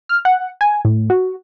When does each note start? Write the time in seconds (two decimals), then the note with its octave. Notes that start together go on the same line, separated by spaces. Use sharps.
0.09 F6
0.25 F#5
0.61 G#5
0.85 A2
1.10 F#4